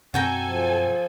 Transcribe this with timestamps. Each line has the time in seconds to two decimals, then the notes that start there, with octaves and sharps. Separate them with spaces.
0.14 F#2 B2 C4 F#4 A4 G5 G#5 A#5
0.47 F3